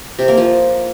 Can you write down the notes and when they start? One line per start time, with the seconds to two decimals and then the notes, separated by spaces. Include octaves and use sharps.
0.19 C3
0.28 A#3
0.37 F3